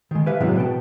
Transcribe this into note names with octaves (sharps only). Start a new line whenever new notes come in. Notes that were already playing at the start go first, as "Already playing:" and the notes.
D#3 G#3
G4 B4 E5 F5 G#5 A5
A2 C3 E3 F#3 G#3 B3
B2 B4 G5 A5